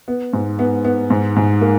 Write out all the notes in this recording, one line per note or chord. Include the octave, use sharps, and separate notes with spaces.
B3
G#2
B3
B3
G#2
G#2
A#3